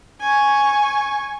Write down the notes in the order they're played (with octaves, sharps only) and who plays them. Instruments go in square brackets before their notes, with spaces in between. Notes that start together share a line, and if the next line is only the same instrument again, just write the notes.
[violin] G#5 C#6